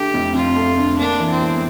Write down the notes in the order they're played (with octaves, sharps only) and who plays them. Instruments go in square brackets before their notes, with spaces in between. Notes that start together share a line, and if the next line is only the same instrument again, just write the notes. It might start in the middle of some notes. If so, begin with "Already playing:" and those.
Already playing: [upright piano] D3 A3 [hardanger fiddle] G4
[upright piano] F1
[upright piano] F2 [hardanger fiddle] F4
[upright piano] A3
D3
[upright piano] A#3 [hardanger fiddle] D4
[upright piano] E3
[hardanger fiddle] C4
[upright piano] E1